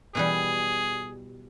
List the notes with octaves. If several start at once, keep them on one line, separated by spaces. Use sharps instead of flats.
B2 E3 G3 G#4